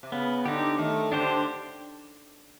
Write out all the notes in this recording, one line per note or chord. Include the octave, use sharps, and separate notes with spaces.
C3
C#3 B3
D3 D#4 G4
D#3 A3
D3 D4 G4 C5